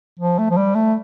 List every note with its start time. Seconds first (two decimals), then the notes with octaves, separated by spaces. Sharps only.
0.19 F3
0.39 A3
0.50 F3
0.57 G3
0.75 A3